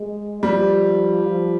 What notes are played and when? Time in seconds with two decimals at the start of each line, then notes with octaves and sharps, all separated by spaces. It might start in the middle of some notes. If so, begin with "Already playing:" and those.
Already playing: G#3
0.42 F3 G3
1.24 F3